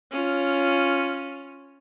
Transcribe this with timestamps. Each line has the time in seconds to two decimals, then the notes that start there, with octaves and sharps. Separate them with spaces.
0.11 C#4 F4